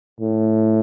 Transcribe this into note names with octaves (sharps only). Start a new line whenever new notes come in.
A2